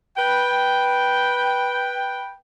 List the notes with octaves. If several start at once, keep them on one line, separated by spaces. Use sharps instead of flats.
B4 G5